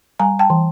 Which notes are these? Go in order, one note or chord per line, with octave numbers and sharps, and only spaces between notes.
G3 G#5 A#5
G5 A5
E3